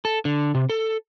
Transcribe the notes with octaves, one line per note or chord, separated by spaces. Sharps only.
A4
D3
C3
A4